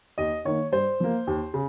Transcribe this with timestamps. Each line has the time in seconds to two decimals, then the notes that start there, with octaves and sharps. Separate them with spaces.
0.18 D#2 D#5
0.45 D#3 A#3 C#5
0.72 G2 C5
1.00 F3 A#3
1.27 D#2
1.54 C#3